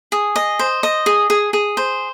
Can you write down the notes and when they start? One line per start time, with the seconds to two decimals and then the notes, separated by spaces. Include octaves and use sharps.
0.12 G#4
0.36 D#5
0.59 C5
0.83 D#5
1.06 G#4
1.30 G#4
1.53 G#4
1.77 C5